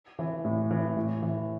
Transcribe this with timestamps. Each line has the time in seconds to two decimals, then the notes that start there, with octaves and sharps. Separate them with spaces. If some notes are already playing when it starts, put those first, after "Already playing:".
0.19 E3
0.45 A2
0.71 E3
0.96 A2
1.23 E3